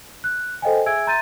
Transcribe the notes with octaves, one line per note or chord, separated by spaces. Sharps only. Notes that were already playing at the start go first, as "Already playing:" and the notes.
F#6
A4 C5 D#5 F5 G5 G#5
G#4 E5 G#5 E6 G#6 D7
E5 A#5 C6 G6 A6 D#7